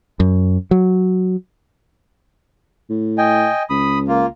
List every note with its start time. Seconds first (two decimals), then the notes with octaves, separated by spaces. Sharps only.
0.20 F#2
0.71 F#3
2.90 A2
3.18 D#5 G5 G#5
3.70 C#2 B5 D#6
4.08 A#3 F4